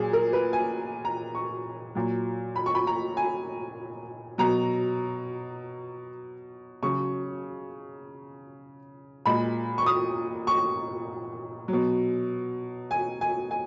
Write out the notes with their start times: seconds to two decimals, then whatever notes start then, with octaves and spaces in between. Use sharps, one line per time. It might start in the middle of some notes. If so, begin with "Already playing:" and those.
Already playing: A#2 F#3 G#4
0.13 A#4
0.33 B4
0.53 G#5
1.05 A#5
1.35 C#6
1.95 A#2 F#3
2.56 B5
2.66 C#6
2.75 B5
2.87 A#5
3.17 G#5
4.38 B2 F#3 A#5
6.83 C#3 F#3 C#6
9.26 A#2 G#3 B5
9.78 C#6
9.86 D#6
10.47 C#6
11.68 F#3
11.73 B2
12.91 G#5
13.21 G#5
13.51 G#5